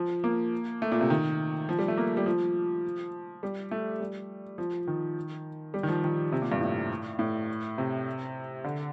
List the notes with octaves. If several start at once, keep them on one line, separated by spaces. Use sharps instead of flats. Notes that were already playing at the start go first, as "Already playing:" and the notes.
Already playing: F3
A#3
A3
A#2
C3
D#3
F3
G3
A3
A#3
G3
F3
G3
A3
G3
F3
D#3
G3
D#3
F3
D#3
C3
A#2
G2
A2
A2
C3
D3